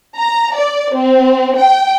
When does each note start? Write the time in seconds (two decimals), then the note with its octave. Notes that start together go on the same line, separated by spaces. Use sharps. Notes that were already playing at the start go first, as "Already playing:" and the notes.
0.17 A#5
0.54 D5
0.93 C4
1.57 G5